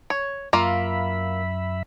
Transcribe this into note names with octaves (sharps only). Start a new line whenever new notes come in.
C#5
F#2 A#3 F4 E5 B5